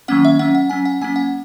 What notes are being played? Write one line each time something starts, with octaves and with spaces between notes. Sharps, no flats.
D#3 F#3 A#3 C#4 F#5
E5
F#3 C#4 F#5
F#5
F#3 C#4 G#5
F#5
F#3 A#3 C#4 G#5
F#5